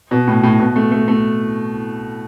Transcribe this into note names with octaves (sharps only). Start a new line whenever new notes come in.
B2
A2
A2
B2
A3
A3
A3